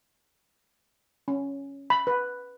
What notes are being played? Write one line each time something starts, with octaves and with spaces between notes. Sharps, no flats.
C#4
B5
B4